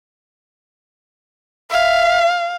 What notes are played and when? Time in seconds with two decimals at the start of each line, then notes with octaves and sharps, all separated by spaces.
1.71 E5 F5